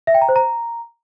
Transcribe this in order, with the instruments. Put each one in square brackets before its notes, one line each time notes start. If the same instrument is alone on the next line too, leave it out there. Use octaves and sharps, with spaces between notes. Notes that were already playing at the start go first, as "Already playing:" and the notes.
[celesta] E5
G5
A#5
C5
A#5